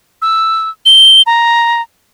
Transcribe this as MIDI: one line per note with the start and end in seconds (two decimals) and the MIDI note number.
0.22 0.70 88
0.86 1.22 103
1.27 1.82 82